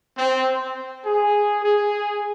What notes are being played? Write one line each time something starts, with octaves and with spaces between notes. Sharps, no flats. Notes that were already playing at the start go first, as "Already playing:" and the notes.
C4
G#4
G#4